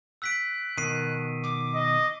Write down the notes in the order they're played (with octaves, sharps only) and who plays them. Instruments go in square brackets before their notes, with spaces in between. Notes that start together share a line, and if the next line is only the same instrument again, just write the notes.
[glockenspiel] E6 B6 D7 [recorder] F#6
[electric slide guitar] B2 D#3 [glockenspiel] C7 D#7
[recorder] D6
[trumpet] D#5